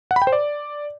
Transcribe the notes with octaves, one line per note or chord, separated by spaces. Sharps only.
F#5
B5
G5
C5
D5